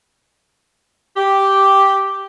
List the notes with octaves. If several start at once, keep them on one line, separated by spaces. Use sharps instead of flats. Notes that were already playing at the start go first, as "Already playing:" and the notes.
G4